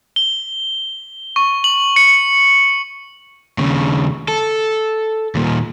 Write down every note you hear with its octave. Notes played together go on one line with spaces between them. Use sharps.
G7
C#6
F#7
C#7
D#2 C#3
A4
D#2 A#2